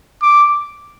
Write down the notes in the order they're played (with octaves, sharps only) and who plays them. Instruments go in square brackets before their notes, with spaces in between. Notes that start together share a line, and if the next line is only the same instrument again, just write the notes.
[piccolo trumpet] D6